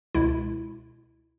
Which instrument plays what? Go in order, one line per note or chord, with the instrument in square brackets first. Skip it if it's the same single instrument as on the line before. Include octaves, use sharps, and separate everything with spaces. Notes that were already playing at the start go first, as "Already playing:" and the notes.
[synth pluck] C#2 B2 G#3 E4